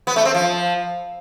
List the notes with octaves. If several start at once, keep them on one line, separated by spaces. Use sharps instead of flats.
B3
A3
C4
F3